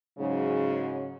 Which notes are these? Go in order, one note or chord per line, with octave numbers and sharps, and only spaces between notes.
G#2 C#3 F#3